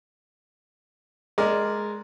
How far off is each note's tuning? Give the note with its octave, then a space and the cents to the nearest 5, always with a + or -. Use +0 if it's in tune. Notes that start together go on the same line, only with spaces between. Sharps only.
G#3 +10 A#4 +0 D5 +0